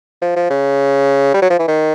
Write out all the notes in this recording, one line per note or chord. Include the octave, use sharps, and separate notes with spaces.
F3
F3
C#3
G3
F#3
F3
E3
D#3